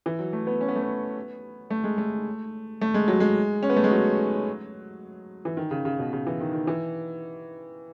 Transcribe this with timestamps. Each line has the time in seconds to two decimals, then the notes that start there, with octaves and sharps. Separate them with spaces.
0.06 E3
0.19 F#3
0.33 A3
0.47 B3
0.61 C#4
0.68 B3
0.76 A3
0.83 B3
1.70 A3
1.84 G#3
1.98 A3
2.81 A3
2.94 G#3
3.08 F#3
3.20 G#3
3.63 C#4
3.70 B3
3.76 A3
3.84 G#3
3.91 F#3
5.45 E3
5.57 D#3
5.71 C#3
5.85 C#3
5.99 B2
6.13 C#3
6.27 E3
6.40 D#3
6.53 D#3
6.67 E3